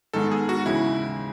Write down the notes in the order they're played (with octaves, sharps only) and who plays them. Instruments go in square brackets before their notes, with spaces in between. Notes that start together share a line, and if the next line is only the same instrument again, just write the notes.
[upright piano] G#2 D#3 G#3 B3 [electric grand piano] A4
[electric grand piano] G#4
F#4
[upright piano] D#2 C#3 E3 G#3 [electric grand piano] E4